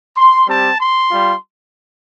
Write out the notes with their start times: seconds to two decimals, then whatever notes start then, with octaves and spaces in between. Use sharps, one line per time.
0.17 C6
0.47 G3 C4 G4 A5
0.79 C6
1.11 G3 F4